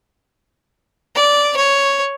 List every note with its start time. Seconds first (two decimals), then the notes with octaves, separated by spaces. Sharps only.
1.16 D5
1.56 C#5